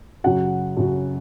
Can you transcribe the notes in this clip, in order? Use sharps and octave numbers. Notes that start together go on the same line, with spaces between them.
F#2 C#3 F#3 F#5
F#2 C#3 F#3